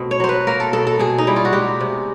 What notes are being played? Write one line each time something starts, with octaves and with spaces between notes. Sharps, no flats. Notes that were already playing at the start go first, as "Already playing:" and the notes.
Already playing: B2 A3 C4
C#5
F#3 C5
B4
A#3 A#4
A4
B2 A4
A4
B2 G#4
D#4
G3 E4
F4
F#4
G#3 G4
C3